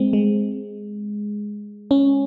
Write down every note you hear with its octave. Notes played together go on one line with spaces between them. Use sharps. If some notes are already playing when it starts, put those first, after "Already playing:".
Already playing: G#3 C4
G#3
C#4